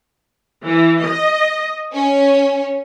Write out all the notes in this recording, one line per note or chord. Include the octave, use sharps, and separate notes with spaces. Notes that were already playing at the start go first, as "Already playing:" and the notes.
E3
D#5
C#4